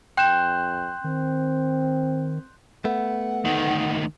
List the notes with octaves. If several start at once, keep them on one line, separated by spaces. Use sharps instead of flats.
F2 G5 C6 F#6 G6 E7
D#3 C4
A3 B3 F#5
D2 D#3